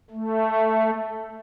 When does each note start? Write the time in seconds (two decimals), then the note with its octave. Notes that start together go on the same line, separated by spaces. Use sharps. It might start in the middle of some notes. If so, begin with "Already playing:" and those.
0.10 A3